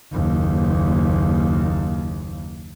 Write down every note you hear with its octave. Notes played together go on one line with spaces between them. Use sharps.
F#1 D#2